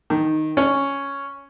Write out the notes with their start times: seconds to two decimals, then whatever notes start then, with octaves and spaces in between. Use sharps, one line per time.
0.10 D#3
0.57 C#4